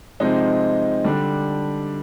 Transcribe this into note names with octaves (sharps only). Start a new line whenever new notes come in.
C3 F3 G#3 C4 D#4
D3 G3 D4